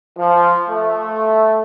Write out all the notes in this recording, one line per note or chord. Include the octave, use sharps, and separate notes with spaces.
F3
A3